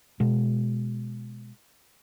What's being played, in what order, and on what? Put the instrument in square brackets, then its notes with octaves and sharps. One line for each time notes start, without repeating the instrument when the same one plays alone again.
[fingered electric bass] B2 G#3